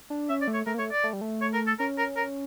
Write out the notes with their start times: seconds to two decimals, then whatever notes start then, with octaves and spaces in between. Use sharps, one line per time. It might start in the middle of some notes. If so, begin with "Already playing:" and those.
0.10 D4
0.29 C#4 E5
0.41 D5
0.47 A3
0.54 C#5
0.66 A3 A#4
0.74 A#3
0.79 A3 C#5
0.91 D5
1.04 A3
1.13 G3
1.21 A3
1.42 C#5
1.54 A#4
1.67 A4
1.80 C#4 A#4
1.98 A#4
2.17 A#4